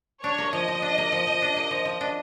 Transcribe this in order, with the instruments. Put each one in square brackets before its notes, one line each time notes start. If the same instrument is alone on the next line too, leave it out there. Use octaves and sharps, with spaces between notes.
[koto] D4 [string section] C#5
[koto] A#3
[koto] F3 [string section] D#5
[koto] F3
D4
A#3
F3
F3
D4
A#3
F3
F3
D4